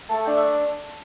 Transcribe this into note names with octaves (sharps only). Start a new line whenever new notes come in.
A3 A5
G5
D4
E5